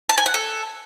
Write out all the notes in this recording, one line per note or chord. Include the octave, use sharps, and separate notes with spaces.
A5
G#5
F#5
A4